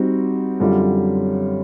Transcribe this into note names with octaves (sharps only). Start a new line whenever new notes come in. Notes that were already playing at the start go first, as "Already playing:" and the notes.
Already playing: G3 C4 D#4 F#4
F#2 D3 G3 C4 F4